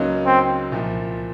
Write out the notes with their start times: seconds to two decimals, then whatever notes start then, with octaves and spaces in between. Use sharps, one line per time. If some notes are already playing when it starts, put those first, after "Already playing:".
Already playing: C#2 C#3 F#3 A#3 D#4
0.26 C4
0.72 C2 A#2 F3